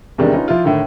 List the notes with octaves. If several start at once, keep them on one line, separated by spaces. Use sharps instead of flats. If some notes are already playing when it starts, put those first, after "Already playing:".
E2 C3 D#3 G3 G#3 D4
C#4 D#4 F4 B4
F3 E4 F4
A2 D3 D#3